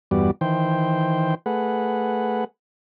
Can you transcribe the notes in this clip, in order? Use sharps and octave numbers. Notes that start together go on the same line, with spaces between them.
E2 G2 G3 B3 F#4 D5
D#3 E3 C5 G5
A3 G#4 B4 F#5